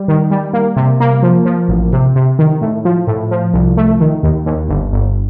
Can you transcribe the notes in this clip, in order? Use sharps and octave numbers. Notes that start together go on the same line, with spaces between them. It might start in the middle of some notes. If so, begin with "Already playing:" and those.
Already playing: G3
D#3
G3
A#3
C3
A#3
F3
F3
A1
C3
C3
D#3
A2
F3
A2
F3
C2
A3
D#3
D#2
D#2
G1
G1